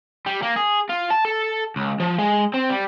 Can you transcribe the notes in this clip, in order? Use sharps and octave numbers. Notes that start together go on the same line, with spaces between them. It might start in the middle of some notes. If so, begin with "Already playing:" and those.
G3
A#3
G#4
F4
A5
A4
C#2
F3
G#3
C4
G3